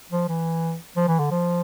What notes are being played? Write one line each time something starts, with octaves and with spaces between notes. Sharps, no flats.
F3
E3
F3
E3
D3
F3